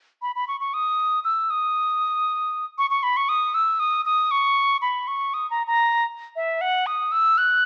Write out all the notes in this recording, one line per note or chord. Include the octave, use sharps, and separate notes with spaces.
B5
B5
C#6
C#6
D#6
E6
D#6
C#6
C#6
B5
C#6
D#6
E6
D#6
D#6
C#6
B5
C#6
D#6
A#5
A#5
E5
F#5
D#6
E6
F#6